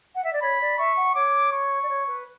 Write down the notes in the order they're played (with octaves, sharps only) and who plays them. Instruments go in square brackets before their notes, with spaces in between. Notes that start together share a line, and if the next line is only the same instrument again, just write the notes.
[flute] F#5
E5
D5
[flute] C#5 [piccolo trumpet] B5
[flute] D5
[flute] E5 [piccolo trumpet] C#6
[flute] F#5
[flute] C#5 [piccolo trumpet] D6
[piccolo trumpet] C#6
[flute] D5
C#5
B4